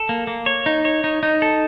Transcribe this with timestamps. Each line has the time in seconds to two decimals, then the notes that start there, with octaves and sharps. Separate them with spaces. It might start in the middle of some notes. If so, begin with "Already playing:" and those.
Already playing: A4
0.09 A#3
0.27 A#3
0.46 C#5
0.66 D#4
0.85 C#5
1.04 D#4
1.23 D#4
1.42 A4